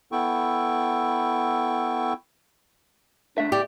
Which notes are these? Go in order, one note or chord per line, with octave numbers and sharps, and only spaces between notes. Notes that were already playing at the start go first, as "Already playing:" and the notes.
B3 E4 A4 G5 C#6
C#2 A3 D4 E5
G4 D5